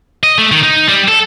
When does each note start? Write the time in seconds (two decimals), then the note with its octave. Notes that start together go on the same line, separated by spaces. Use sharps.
0.23 D#5
0.38 A3
0.52 D#3
0.63 D#4
0.89 G3
1.08 A4